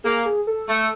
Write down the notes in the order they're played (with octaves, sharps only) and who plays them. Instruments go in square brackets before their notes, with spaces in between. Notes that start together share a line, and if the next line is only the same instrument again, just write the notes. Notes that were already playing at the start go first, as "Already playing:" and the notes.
[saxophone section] A#3 [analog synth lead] G#4
[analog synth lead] G#4
A4
[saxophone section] A3